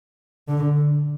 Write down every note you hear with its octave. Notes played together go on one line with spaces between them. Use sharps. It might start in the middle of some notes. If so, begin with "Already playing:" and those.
D3